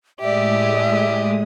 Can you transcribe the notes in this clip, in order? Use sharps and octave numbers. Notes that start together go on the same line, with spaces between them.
A2 G#3 G4 D5 E5 D#6